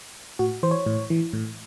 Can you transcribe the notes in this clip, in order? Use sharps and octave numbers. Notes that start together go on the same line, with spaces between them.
A2 F#4
E3 C5
C#5
A2
E3
A2